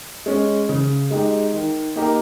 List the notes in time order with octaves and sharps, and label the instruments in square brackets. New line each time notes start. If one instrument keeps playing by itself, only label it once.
[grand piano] G#3 C#4
C#3
G#3 D#4 G4
D#3
A#3 D#4 G4 A#4